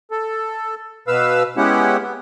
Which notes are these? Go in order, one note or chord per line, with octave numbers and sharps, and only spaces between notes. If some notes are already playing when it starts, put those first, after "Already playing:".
A4
B2 B4 F5 E6
G#3 B3 C#4 E4 G4 F#5
B3